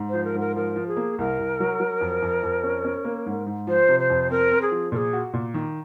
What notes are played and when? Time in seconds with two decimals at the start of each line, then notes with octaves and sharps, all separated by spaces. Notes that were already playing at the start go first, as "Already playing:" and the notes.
Already playing: G#2
0.09 F3 C5
0.24 A#4
0.35 G#2 A#4
0.56 F3 A#4
0.76 F3
0.87 G#4
0.97 A#3
1.18 C2 A#4
1.39 C2
1.60 F#3
1.80 F#3
2.01 F2
2.22 F2
2.43 F2
2.64 C#4
2.84 C#4
3.05 A#3
3.26 G#2
3.47 G#2
3.67 F3 C5
3.89 C3
3.99 C5
4.10 F2
4.30 C4 A#4
4.51 C4
4.61 G#4
4.71 F3
4.92 A#2 A#4
4.96 G#4
5.13 F#4
5.34 A#2
5.54 D#3